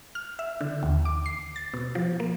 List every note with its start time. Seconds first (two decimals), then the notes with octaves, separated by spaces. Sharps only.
0.15 F6
0.39 E5
0.61 D3
0.83 D#2
1.05 D6
1.26 C7
1.56 A6
1.74 B2
1.95 F3
2.20 A#3